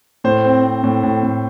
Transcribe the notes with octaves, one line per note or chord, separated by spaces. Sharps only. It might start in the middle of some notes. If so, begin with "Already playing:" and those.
A2 C5
C4
C4
A2
A2
A2